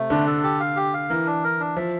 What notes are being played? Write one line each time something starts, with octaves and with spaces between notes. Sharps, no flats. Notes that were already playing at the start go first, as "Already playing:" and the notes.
Already playing: C3 A3
D3 D4
A4
G4
F5
G4
F5
E3 A#4
D4
A#4
D4
F3 E5